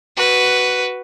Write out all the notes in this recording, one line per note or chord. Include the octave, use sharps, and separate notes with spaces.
F#4 B4